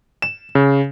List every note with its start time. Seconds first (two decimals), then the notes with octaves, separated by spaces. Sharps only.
0.22 E7
0.55 C#3